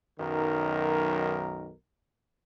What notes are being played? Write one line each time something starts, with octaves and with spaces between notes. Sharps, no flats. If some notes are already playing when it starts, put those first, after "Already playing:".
B1 F#2 D#3 D#4 A#4